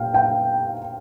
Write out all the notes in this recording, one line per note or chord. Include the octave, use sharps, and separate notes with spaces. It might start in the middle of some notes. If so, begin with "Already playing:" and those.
Already playing: A#2 G3 F5 G5
G5